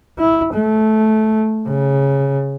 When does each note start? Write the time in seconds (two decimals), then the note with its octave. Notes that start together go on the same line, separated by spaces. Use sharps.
0.19 E4
0.53 A3
1.67 C#3